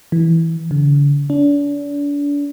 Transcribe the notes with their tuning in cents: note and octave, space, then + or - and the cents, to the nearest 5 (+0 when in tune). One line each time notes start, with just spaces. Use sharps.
E3 -5
D3 -45
D4 -35